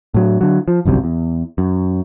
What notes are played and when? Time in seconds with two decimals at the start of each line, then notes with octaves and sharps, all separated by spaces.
0.14 A2 F#3
0.41 D3 F#3
0.68 F3
0.85 G1 C2 F#2 C3
1.04 E2
1.58 F#2